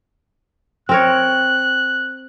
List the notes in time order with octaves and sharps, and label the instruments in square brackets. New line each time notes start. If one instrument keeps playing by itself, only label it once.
[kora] C4 A#4 C#5 [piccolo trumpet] F#6